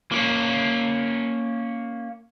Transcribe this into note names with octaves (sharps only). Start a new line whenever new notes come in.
A#3 C#4